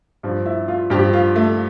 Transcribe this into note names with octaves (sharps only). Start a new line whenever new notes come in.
G2 F3
E4
F4
G2 F3 G4
F4
A3